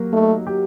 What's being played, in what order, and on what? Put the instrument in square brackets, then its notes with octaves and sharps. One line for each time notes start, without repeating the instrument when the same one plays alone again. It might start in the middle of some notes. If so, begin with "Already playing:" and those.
Already playing: [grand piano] F#3 A#3 G4
[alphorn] A3 [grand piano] D#4
[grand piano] G4